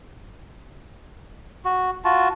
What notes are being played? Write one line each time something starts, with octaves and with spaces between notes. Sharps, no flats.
F#4
F4 F#4 A5